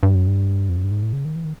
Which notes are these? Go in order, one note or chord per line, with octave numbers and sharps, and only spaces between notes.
G2
F#2
G2
F2
F#2
G2
G#2
A2
C#3
D#3
E3
D#3